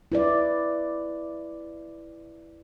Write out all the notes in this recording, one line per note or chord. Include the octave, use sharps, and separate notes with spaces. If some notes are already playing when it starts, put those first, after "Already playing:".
E4 B4 D5